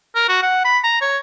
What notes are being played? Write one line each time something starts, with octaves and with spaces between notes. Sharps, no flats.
A#4
F#4
F#5
B5
A#5
C#5